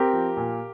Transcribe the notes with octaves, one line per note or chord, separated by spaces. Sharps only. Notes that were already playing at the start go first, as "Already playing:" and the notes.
Already playing: C4 G4 A#4
F3
A#2